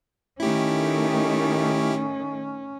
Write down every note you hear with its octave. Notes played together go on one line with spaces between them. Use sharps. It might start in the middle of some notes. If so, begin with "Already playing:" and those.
D#3 A3 C#4 E4 G4